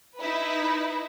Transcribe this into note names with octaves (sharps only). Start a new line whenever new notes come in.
D#4 E4 B4